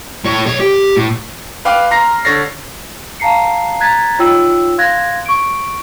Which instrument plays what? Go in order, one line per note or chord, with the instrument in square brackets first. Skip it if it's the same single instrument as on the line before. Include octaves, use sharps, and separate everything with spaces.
[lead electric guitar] A2 C#5
B1 C#5
G4
A2
[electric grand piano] B4 F5 G5 D6 F6 F#6
A#5 C6 A#6 C7
D3 C#5 A6 A#6 C7
[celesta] F5 A5 A#5 C7 C#7
A#5 F#6 G#6 A6 B6
D#4 F4 C#5 G5 E6
F5 C6 F#6 G#6 A#6
C#6 D7